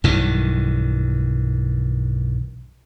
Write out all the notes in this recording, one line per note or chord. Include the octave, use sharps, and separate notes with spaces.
B1 G2 D#3 E3